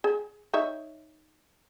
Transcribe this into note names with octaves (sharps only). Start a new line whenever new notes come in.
G#4
D#4 C#5 E5